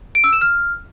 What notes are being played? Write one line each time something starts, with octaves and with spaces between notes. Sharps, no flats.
D7
E6
E7
F6